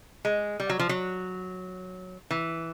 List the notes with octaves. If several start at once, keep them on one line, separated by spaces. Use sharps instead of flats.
G#3
G3
F#3
F3
F#3
E3